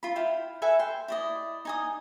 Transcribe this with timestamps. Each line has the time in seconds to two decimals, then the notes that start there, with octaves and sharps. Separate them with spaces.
0.03 F4 B5
0.16 E4 F5 G5
0.62 A4 B4 E5 G#5
0.79 G5 C6
1.08 E4 D5 D#5
1.65 D#4 G#5 D#6